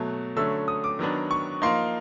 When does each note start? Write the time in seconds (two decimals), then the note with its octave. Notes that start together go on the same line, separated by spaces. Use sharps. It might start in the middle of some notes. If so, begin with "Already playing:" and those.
Already playing: B2 F#3 A3
0.36 D3 F#3 A3 C#4 E6
0.68 D#6
0.84 D6
0.99 D#3 F#3 B3 D4
1.31 C#6
1.62 F3 A#3 D#4 C6